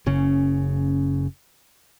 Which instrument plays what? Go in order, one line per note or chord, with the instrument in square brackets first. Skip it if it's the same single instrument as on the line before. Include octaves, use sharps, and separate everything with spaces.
[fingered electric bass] F#1 C#3 C#4